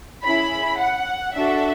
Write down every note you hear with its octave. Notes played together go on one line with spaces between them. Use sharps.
C#4 E4 G#4 B5
F#5
D4 F#4 A4 E5